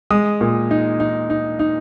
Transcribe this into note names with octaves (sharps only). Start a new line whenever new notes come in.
G#3 D#6
A#2
D#4
D#4
D#4
D#4